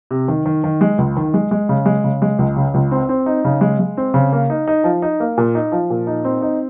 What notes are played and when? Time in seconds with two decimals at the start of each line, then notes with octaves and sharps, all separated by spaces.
0.11 C3
0.28 D#3
0.46 D#3
0.64 D#3
0.81 G#3
0.98 C#2
1.17 D#3
1.34 G#3
1.51 G#3
1.69 C#3
1.86 G#3
2.04 C#3
2.22 G#3
2.39 C#2
2.56 C#3
2.74 C#2
2.91 C4
3.09 C4
3.26 D#4
3.45 C#3
3.61 G#3
3.79 G#3
3.97 C4
4.14 C#3
4.32 A#3
4.50 D#4
4.68 D#4
4.84 F3
5.02 D#4
5.20 A#3
5.38 A#2
5.55 D#4
5.72 F3
5.90 A#2
6.07 D#4
6.24 C4
6.42 D#4